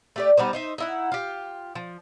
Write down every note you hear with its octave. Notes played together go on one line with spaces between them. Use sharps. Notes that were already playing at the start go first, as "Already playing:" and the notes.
A3 G4 D5
G3 B3 D#4 C5
D#4 C5 E5
D#4 E4 F#5
F4 G4
F3